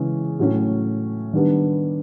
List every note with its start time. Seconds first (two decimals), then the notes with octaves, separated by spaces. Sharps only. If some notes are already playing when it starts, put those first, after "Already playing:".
Already playing: C#3 E3 G#3 C#4
0.39 A2 F#3 A3 C#4
1.33 D#3 G3 B3 D4